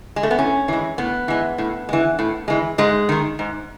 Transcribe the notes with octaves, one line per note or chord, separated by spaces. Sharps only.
G#3
A3
B3
A2 C#4
E3 G#3
A2 B3
E3 G#3
A2
E3 G#3
A2
E3 G#3
G#2 G#3
D#3 G#3
G#2